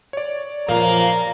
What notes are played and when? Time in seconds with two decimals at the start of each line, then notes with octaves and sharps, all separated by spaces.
0.13 C#5 D5
0.68 A#2 F3 A#3 A#5